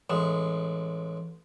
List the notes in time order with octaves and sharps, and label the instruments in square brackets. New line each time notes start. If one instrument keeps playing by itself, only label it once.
[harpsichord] A1 G#3